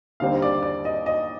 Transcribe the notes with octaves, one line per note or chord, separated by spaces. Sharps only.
D#2 D3 G3 C4 D#4 F5
D5
D5
D#5
D#5